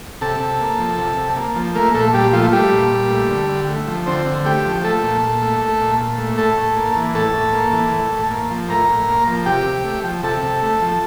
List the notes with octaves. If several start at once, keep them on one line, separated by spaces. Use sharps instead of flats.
C3 A4 A5
C3
A#3
F3
C3
C3
A#3
F3
A3 A#3 A#4
A#2 A3 A4
A#2 G3 G4
F3 A3 F4
G3 A3 G4
A#2
A#2
A3
D3
D3
A3
F3
D3 C4 C5
D3
A3 G4 G5
F3
A3 A4 A5
A#2
A#2
A3
A3
A#2
A#2
A3
A2 A4 A5
A2
A#3
E3
A2 A4 A5
A2
A#3
E3
A2
A2
A#3
F3
A2 A#4 A#5
A2
A#3
F3
C3 G4 G5
C3
A3
F3
C3 A4 A5
C3
A3
F3